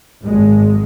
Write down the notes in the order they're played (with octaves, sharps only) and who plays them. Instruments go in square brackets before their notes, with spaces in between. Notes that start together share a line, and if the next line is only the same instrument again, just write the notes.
[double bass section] G#1 G#3